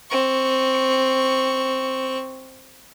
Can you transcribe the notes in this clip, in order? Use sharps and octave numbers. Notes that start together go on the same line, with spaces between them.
C4 C#6